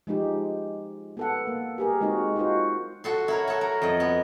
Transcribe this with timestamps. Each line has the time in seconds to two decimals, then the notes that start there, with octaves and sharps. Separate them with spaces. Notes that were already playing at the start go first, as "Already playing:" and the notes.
0.07 F3 G#3 D#4 G4
1.17 B3 A4 F#5
1.47 A#3
1.78 G4 G#4 A#4
2.01 G#3 C4 D#4 F#4 A#4
2.36 D#4 F4 F#4 C5
3.04 F#4 A4 C6
3.28 E4 A#4 C#5
3.47 F#4 A4
3.61 A#4
3.82 F2 D#5
4.00 B3